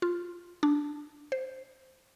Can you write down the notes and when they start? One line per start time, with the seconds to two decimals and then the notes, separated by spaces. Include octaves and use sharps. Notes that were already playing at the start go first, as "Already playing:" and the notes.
0.02 F4
0.63 D4
1.32 C5